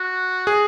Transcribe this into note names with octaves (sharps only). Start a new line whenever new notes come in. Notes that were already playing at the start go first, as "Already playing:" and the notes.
Already playing: F#4
G#4